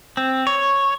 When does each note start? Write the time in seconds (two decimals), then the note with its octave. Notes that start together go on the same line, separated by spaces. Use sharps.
0.17 C4
0.47 C#5